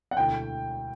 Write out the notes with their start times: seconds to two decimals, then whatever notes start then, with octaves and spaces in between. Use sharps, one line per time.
0.11 F#5
0.17 E1 D2 D3 A3 E4 G5